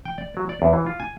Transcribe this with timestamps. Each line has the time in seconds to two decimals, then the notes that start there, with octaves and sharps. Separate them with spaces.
0.05 G5
0.18 D5
0.37 F#3
0.49 D5
0.62 E2
0.73 E3
0.86 F4
1.00 G#5